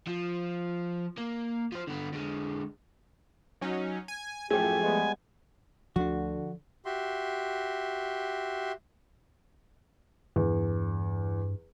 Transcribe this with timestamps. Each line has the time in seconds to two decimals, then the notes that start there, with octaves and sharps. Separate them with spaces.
0.07 F3
1.17 A#3
1.72 F3 C5
1.87 D3 B3
2.13 D3 G#3
3.61 F#3 C#4 D#4
4.08 G#5
4.51 F#2 A2 F3 A3 G4 G#4 G#5
4.83 G3 G#3 B3
5.96 D2 D3 F3 D4 F#4
6.85 F#4 G4 E5 C6
10.36 E2 G2